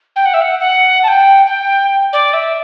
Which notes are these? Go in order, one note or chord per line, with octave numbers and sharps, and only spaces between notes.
G5
F#5
E5
F#5
F#5
A5
G5
G5
D5
E5